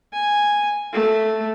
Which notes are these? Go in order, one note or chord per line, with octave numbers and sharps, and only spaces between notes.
G#5
A3